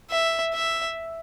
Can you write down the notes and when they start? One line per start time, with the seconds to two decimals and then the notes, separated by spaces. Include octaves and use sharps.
0.10 E5
0.54 E5